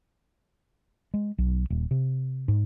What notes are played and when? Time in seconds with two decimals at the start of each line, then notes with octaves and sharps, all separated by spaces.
1.14 G#3
1.38 B1
1.70 D#1
1.91 C3
2.48 G#2